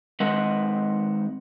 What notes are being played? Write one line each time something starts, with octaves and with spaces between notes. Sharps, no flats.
D#3 G#3 C4 B4 D#5 F#5